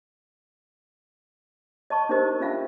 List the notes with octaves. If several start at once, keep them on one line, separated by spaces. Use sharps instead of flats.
D#5 A5 C#6
D4 D#4 G4 A#4 C5 D#5
C#4 D4 F4 E5 F5 G#5